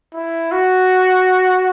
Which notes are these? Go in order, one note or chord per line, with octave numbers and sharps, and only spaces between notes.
E4
F#4